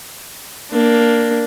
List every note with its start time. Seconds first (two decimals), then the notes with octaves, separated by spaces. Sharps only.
0.70 A#3 D4